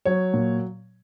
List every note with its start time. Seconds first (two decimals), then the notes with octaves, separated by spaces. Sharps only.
0.05 F#3 C#5
0.34 A#2